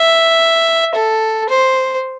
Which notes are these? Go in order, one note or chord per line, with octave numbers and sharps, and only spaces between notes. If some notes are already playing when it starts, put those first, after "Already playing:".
Already playing: E5
A4
C5